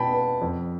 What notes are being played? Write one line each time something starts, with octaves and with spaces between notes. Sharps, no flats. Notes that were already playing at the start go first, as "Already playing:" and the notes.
Already playing: B2 B3 G5 A5 B5
B3
F2